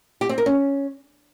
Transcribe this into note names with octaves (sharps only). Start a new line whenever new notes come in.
G4
C4
A#4
C#4